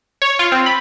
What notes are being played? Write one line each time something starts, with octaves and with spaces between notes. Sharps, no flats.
C#5
F4
C4
B5